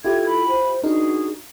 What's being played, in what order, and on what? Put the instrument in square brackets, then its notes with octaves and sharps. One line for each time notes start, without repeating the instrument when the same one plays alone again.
[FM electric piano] E4 F4 G4 [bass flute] A4 [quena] G#6
[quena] B5
[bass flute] C5
[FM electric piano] D4 D#4 A#4 [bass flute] F#4 [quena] G#4